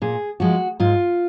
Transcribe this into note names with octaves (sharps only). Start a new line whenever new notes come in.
A#2 G#4
F3 G#3 F#4
G#2 F4